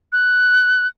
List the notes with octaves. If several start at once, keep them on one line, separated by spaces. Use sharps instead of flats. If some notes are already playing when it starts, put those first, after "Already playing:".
F#6